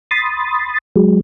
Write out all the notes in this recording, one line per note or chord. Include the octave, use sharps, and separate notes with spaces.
B5 C6 D#6 A6
F#3 G#3